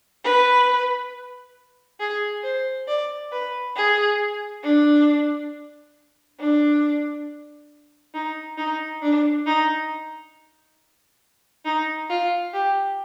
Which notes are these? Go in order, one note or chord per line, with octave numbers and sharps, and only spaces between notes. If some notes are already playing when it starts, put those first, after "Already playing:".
B4
G#4
C5
D5
B4
G#4
D4
D4
D#4
D#4
D4
D#4
D#4
F4
G4